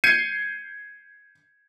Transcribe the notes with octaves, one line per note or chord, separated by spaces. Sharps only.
G6 G#6 C7 C#7 D#7